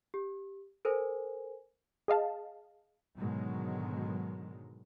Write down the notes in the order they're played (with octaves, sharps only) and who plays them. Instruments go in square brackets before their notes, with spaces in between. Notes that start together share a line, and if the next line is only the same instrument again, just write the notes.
[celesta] G4
A4 A#4 C5 G#5
[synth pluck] G#4 D#5 F5 A5
[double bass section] G#2 B2 D3 D#3 F#3 G#3